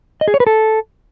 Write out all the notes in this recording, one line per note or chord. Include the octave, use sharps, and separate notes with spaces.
D#5
G#4
C#5
B4
A4